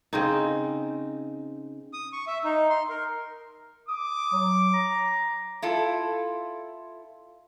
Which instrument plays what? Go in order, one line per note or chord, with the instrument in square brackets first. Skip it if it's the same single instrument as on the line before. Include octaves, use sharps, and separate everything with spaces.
[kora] C#3 C4 D#4
[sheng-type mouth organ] D#6
C#6
E5
D#4
C6
A#4
[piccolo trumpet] D6 [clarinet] D#6
[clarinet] F#3
A#5
[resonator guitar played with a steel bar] E4 F4 A4